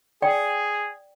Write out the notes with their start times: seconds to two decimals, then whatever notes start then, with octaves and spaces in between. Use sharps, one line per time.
0.22 G#4 D5 G5